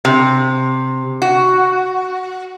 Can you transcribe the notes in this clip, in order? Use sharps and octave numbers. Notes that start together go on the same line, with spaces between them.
C3
F#4